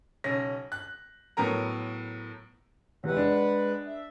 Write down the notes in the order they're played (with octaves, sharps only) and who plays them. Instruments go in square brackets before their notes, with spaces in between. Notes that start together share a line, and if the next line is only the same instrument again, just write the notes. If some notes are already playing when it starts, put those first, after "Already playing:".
[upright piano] B1 C#3 C#4 A#6
F#6
A2 F#3 B3 A#4 A#5
[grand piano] E2 C3 [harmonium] G#3 B4 F#5
[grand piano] D4
[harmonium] E5